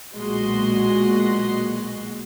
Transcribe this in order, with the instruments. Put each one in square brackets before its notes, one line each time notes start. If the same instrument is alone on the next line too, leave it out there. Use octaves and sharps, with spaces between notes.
[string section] B1 A#2 G#3 F#4 D#5 C6